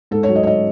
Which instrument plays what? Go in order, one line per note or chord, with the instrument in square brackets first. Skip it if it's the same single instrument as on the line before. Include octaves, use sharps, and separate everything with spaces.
[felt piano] G#2 A4
C#5
F#3
D#5
C#5
D#5